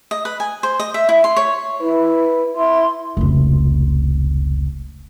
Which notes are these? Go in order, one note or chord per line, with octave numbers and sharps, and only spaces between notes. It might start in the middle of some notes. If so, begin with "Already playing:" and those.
D#5
B4
G#5
C5
D#5
E5
E4
C6
C#5
E4 B4
E4 C6
F1 C#2